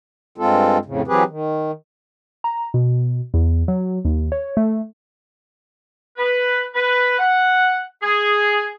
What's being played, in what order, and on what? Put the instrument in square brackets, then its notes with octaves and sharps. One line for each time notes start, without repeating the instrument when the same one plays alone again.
[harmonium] G2 G#3 C4 F4 A4
F2 A2 C#3
E3 F#3 C4 G4 G#4 B4
D#3
[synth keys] A#5
B2
E2
F#3
D#2
C#5
A3
[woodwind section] B4
B4
F#5
G#4